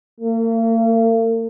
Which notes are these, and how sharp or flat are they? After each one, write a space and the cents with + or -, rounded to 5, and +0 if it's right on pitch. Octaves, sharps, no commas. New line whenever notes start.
A#3 -45